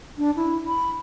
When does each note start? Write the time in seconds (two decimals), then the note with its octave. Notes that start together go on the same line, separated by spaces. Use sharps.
0.18 D4
0.36 E4
0.67 B5